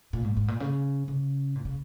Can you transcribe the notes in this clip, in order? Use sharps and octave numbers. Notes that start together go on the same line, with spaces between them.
A#2
G#2
G#2
A#2
C#3
C#3
A#2
C#3